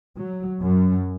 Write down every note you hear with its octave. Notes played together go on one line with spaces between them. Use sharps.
F#3
F#2